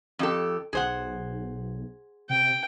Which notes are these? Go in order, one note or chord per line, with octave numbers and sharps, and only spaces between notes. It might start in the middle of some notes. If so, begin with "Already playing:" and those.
F2 G4 A4
B1 G#4 C5 F#5
C3 G5